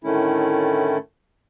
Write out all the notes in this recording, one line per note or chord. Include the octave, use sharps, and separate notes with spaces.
A2 D3 D#3 A3 C#4 E4